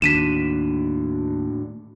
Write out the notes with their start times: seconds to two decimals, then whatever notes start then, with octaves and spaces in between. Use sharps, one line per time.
0.02 D#2 A2 D4 F#4 B6 D#7 E7